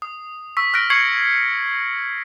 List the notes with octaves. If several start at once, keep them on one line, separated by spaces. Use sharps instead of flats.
D#6
C#6 E6 B6
F6 F#6 A#6 D7
C#6 G#6 C7 C#7 F#7